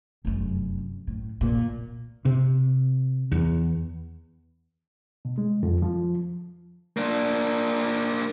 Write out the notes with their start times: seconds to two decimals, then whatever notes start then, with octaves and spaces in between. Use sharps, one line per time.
0.25 F1 F#2
1.07 A2
1.41 A#2
2.25 C3
3.32 E2
5.25 B2
5.38 G#3
5.63 F2
5.82 F3
6.97 A#3 D4